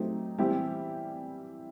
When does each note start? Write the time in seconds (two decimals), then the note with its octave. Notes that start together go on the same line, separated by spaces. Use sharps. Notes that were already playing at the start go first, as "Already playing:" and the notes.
Already playing: F#3 A3 C4 D#4 G4
0.39 E3 G3 C4 E4 G4